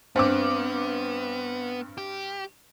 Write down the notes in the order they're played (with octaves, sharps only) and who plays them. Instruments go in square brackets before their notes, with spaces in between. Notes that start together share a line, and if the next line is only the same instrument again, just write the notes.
[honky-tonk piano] G2 [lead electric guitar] B3 [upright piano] C4 D6
[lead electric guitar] G4